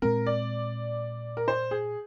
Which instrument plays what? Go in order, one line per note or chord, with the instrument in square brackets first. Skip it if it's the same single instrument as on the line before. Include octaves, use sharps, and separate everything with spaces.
[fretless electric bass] A#2 G#3 C4 [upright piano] A#4
[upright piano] D5
A#4
C5
G#4